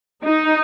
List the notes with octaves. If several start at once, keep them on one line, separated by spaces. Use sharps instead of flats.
D#4